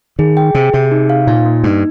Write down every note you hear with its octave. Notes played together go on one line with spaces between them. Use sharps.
D#3 G#4
G5
C3 G#4
C3 G#4
D#4
F5
A#2 D#4
A#3
G2 D#4